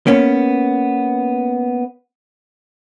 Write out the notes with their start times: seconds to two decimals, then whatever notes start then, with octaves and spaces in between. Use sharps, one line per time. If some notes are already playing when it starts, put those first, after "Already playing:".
0.07 A#3 B3 C#4